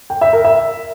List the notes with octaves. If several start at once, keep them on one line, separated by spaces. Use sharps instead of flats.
G5
E5
A#4
E5